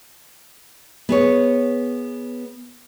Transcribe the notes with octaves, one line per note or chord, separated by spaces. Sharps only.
B3 G#4 C#5